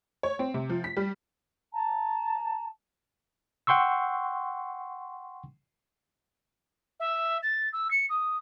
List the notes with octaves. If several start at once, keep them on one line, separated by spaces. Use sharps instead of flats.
C#5
C4
C3
F3
B6
G3
A5 A#5
F#5 G5 C6 C#6 E6
E5
A6
E6
C#7
D#6